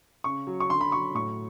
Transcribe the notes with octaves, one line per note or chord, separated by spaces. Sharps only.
C#3 C#6
F#3
C#6
D3 C6
B5
F#3 C#6
A2 C#6